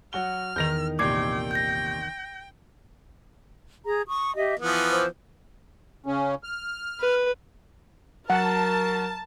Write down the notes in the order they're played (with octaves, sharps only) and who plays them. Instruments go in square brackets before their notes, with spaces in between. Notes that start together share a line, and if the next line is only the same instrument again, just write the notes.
[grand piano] F#3 F#4 G7 [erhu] F6
[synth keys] E2 D#3 [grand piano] G6 A#6 F7
[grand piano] A#1 C3 [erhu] G5 [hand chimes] D6 G#6 C7
[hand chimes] G6 A#6
[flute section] G#4 A#5
C#6 D#6
G4 D#5 E5
[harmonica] E3 F3 B3 [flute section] D#6
[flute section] C5
[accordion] C#3 C#4
F6
[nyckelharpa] B4
[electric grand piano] F#3 [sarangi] A#4 [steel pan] F#5 [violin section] A5